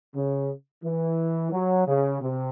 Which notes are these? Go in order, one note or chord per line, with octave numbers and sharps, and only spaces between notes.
C#3
E3
F#3
C#3
C3